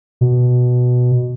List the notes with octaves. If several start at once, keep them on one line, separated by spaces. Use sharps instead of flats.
B2